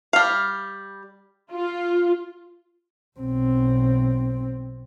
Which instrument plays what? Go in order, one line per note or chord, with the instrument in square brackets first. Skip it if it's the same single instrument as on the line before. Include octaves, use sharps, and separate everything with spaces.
[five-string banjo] G3 F5
[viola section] F4
[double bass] B1 C4